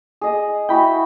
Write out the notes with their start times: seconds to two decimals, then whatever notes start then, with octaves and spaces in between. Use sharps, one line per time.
0.21 G#4 D#5
0.69 E4 F#4 G5 G#5 B5